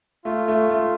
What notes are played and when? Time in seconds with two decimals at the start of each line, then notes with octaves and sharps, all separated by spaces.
0.25 A3 F4
0.48 A3
0.69 A3